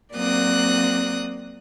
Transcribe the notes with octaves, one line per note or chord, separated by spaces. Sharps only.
F#3 A#3 C4 D5 D#6 F#6